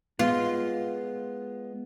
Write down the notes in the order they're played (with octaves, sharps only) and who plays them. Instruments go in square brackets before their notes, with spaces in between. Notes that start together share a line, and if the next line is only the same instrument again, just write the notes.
[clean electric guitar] G#3 B3 [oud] F4